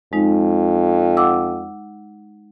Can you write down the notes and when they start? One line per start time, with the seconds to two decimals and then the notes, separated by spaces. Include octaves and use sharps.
0.13 F2 G#3 D#4
1.17 F#5 D6 E6